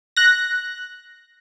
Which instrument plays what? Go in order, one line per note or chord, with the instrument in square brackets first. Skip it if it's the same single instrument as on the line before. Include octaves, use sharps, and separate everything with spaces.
[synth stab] F#6 A#6